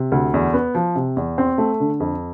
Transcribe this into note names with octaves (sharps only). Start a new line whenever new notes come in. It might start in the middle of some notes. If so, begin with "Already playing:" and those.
Already playing: C3
D2
E2
B3
F3
C3
E2
C4
A3
D3
F2